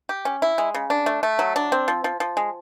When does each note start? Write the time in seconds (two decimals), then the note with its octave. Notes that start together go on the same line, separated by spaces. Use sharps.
0.09 G4
0.25 C#4
0.42 E4
0.58 G#3
0.74 C#3
0.90 D4
1.06 A3
1.23 A3
1.39 F#3
1.56 D4
1.72 C4
1.88 F3
2.04 F3
2.20 F3
2.37 G#3